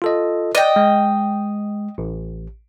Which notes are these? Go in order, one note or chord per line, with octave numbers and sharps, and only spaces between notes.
F4 A4 D#5
D5 D#5 G5
G#3
A1